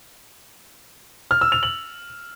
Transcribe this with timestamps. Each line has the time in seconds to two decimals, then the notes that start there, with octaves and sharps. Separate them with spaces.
1.31 F6
1.41 E6
1.52 F7
1.63 F#7